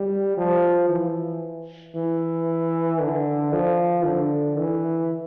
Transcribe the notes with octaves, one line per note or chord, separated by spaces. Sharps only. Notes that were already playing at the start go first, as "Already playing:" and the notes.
Already playing: G3
F3
E3
E3
D3
F3
D3
E3